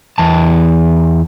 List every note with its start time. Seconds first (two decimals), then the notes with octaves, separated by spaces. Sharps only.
0.18 E2 A5